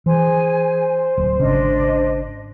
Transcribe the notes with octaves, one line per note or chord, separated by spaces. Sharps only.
E3 G#4 C5 G#5
D1
G#1 C#3 D4 D#5